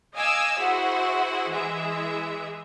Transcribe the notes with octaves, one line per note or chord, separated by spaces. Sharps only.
D#5 F5 G#5 D6 E6
E4 F#4 G#4 C5 F#5
E3 G#3 G#4 E5